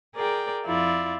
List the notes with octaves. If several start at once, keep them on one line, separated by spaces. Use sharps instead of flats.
G#4 A#4 D5 G5
F2 F3 E4 F4 D5